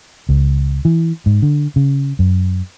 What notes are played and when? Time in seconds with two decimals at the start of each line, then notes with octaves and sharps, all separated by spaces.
0.29 C#2
0.85 E3
1.26 G#2
1.42 D3
1.76 C#3
2.19 F#2